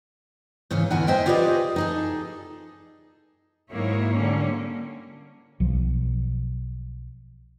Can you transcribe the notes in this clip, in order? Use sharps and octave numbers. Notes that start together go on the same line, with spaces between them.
G#2 C#3 E3 C#4
E2 D3 E4 A#4 F#5 G#5
C5 D#5 E5 G5 G#5
F4 G4 G#4 B4 D5 D#5
D#4 G#4 A4
G#2 D#3 F#3 A#3 E4 C#5
D3 G3 A#3 C#4
B1 F3